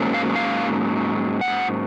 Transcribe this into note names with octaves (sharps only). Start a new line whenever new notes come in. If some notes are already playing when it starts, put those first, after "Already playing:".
Already playing: G#2 F#3 A#3 C#4
F5
F5
F#5